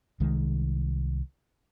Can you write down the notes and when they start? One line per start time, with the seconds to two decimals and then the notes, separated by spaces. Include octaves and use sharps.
0.20 C2 D#3 G#3